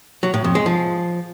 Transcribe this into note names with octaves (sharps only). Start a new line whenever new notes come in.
F#3
A2
F2
G#3
F3